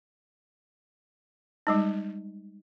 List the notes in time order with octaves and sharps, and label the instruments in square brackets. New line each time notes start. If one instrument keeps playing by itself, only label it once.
[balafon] G3 G#3 D#4